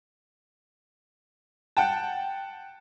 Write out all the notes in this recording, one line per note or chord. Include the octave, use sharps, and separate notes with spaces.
F#5 G5 A5